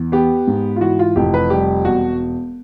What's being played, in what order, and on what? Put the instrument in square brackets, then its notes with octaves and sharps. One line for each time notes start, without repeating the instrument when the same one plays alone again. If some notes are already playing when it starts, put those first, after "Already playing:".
Already playing: [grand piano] E2
B3 G4
G#2
F4
E3 F#4
F4
F1 G4
B4
G3 G4
E1 F#4